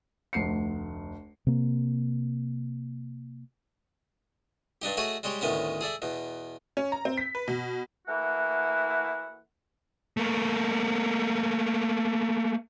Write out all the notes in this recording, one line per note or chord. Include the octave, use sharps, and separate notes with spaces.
F1 D2 C7 C#7
C3 A#3
G2 D4 D#4 G4
A3 F#4 G#4 C#5 D#5
G3 G#3 G4 C#5
D2 A2 D#3 B3 C#4
G#4 A4 D5 E5
E2 B2
C#4
A#5
C4
B6
B4
B2
E3 A3 A#3 E4 F#4 F#5
A3 A#3